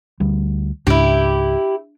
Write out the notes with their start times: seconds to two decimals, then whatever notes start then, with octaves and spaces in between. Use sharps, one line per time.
0.20 D2 G3
0.87 C#2 G#2 D4 E4 G4